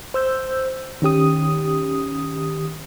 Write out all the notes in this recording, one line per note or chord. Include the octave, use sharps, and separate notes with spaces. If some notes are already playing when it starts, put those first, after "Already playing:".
C5 E6 G6
D#3 C#4 G4 D#6